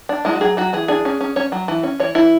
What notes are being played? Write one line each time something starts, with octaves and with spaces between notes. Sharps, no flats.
D4
G#3 E4
F#4
F#3 G#4
F#3 F#4
E3 G#4
D4 G#4
C#4
C#4
C#4 C#5
F#3
E3
C#4
E3 C#5
E3 E4